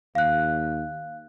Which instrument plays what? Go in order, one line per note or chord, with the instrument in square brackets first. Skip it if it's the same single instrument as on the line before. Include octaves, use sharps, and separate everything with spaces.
[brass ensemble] D#2 [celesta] F5 F#6